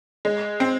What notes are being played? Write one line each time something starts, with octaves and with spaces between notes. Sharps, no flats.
G#3
C4